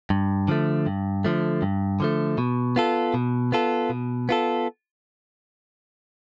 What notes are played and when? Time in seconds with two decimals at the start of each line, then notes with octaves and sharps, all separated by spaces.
0.10 G2
0.48 D3 F3 A3
0.86 G2
1.25 D3 F3 A3
1.62 G2
2.00 D3 F3 A3
2.38 B2
2.76 B3 F4 A4
3.14 B2
3.52 B3 F4 A4
3.90 B2
4.29 B3 F4 A4